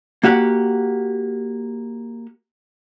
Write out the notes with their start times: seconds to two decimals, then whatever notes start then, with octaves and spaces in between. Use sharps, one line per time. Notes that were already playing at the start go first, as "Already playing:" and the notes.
0.23 A#3 F#4 G4 F#5